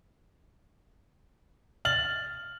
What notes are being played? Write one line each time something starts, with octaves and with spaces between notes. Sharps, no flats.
F6 A6 F#7